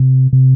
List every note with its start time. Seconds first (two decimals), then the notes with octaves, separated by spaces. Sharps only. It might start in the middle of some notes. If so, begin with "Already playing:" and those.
Already playing: C3
0.33 C3